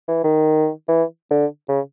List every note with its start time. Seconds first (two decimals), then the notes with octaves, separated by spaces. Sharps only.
0.08 E3
0.24 D#3
0.88 E3
1.31 D3
1.69 C#3